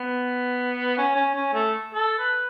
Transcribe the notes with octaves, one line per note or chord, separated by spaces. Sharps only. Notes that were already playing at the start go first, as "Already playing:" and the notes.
Already playing: B3
C#4
C#4
C#4
A3
A4
B4